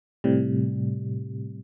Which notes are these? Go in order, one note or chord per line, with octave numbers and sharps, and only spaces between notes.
A2 C3 G3